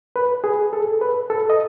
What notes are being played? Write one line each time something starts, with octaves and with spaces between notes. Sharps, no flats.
B4
G#4
A4
B4
A4
D#5